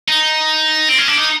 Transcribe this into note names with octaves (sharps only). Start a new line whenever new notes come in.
D#4
C4
C#4
D4
D#4